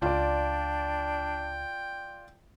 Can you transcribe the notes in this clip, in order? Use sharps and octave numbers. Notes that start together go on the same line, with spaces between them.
C#2 D4 F4 D5 G5